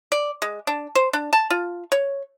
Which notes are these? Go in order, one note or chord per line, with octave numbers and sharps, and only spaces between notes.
D5
G#3
D4
C5
D4
A5
F4
C#5